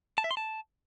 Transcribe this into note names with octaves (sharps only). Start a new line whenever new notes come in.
A5
E5
C6
A5